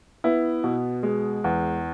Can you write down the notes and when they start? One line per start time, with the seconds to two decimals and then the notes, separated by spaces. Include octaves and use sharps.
0.24 B3 E4
0.64 B2
1.03 G#3
1.44 E2